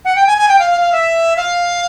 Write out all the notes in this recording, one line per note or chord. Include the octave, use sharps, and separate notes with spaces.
F#5
G5
G#5
G#5
G5
F5
F5
F5
E5
F5